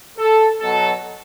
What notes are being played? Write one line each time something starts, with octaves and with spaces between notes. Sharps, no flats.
A4
B2 F#3 A4